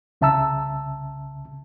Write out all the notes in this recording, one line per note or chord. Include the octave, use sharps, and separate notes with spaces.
C2 C#3 E5 A5 A#5 E6